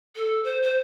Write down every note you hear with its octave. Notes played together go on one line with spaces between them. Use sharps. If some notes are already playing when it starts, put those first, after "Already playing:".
A4
C5
C5